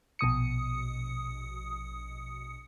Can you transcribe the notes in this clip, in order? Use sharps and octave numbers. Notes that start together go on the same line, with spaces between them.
A#1 B2 D#6 C#7